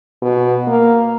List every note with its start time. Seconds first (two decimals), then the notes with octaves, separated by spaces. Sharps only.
0.22 B2
0.67 A#3